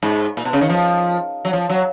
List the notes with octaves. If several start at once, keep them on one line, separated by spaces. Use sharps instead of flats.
G#2
A#2
B2
C#3
D#3
F3
F#3
F3
F#3